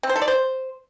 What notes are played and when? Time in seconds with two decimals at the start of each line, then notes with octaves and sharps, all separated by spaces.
0.03 C4
0.09 C5
0.16 A4
0.22 D5
0.28 C5